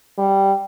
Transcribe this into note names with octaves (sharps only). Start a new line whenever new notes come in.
G3